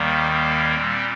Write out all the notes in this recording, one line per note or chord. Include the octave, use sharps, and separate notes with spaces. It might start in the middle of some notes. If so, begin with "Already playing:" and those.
Already playing: D#2 D#3 G3 A#3
A#3
A#2 G3 C4